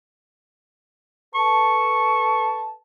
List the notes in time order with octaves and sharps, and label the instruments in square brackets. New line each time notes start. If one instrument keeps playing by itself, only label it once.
[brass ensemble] A4 B4 A5 [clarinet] C#6